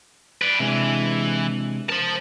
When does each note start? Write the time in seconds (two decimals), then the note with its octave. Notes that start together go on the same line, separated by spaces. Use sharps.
0.42 B4 D5
0.60 C3 E3 G#3 D4
1.89 A#4 C5 A5